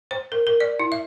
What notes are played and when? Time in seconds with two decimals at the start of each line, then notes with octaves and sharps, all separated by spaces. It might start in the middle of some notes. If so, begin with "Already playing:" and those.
0.11 C5
0.32 A#4
0.47 A#4
0.60 D5
0.80 E4
0.92 E5